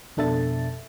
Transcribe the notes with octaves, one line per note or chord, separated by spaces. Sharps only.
F2 B2 D4 A4 E5 A6